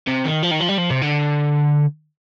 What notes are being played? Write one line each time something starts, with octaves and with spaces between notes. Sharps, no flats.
C3
D#3
F3
D#3
F3
G3
F3
C3
D3